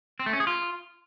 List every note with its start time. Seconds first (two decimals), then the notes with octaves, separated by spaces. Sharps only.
0.20 C4
0.26 A3
0.33 C#4
0.40 G#4
0.47 F4